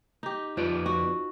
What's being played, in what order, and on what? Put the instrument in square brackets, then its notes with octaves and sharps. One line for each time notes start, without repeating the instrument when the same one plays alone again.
[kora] D#4 G4
[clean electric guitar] F2 B4 D5 [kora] F3
[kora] F#4